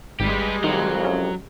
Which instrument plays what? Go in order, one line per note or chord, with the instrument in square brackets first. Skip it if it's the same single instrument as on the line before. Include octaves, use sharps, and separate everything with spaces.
[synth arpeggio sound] G#1 [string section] G3 G#3 [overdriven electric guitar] G4 B4
[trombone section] C2 F2 [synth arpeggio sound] D#3 [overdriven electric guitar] F#3
[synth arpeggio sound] C#4